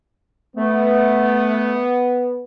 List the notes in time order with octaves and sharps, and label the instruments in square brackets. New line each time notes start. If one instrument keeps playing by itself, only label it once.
[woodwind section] A3 [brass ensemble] B3